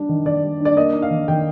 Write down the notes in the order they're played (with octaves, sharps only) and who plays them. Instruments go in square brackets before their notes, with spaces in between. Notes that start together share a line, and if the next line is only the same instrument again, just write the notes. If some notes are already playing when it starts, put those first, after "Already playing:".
Already playing: [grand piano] G3 D4
D#3
[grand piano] D#3 [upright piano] D5
[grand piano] G3
D4
[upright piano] D5
[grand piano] A#3 [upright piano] D#5
[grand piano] D#4
[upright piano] F5
[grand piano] D#3
[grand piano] D#3 [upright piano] G5